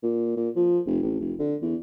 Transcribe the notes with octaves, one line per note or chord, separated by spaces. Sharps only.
A#2
A#2
F3
F1
A1
F1
D3
E2